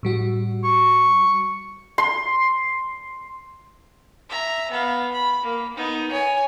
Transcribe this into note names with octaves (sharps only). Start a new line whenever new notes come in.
A2 G3 F#4
C#6
C6
E5 A#5
B3 F5
B5
A#3
B3 D#4
C#5 G#5